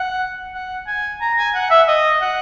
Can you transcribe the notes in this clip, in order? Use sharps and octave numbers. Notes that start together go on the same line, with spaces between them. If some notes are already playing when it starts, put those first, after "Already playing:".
Already playing: F#5
F#5
G#5
A#5
G#5
F#5
E5
D#5
F#5